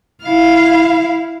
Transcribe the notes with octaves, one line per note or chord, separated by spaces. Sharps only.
E4 F5